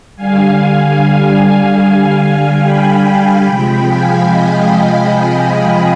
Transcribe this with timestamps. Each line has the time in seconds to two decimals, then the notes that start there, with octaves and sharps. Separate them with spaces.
0.16 D3 G3 F5 G#5
0.98 F5 G#5
1.80 F5 G#5
2.62 G5 B5
3.44 C3 F3 G#3 G5 B5
3.85 F5 G#5
4.26 D#5 G5
5.08 F5 G#5